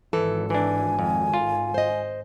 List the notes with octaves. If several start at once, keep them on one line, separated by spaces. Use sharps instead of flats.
G#1 E3 A4
E3 D4 G#5
F2
F4
C5 D#5